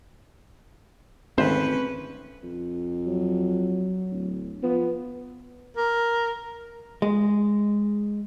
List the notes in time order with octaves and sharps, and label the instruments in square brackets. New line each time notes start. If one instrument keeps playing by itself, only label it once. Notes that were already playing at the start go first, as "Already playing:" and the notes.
[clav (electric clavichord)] G#1 D2 C5 [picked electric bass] C4 [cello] C#4 B4
[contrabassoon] F2
[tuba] F#3
[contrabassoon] D1
[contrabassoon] F3 [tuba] B3
[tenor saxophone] A#4
[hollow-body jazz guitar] G#3